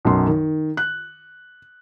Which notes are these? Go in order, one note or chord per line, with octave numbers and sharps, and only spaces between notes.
B1 F#2 C6
D#3
F#6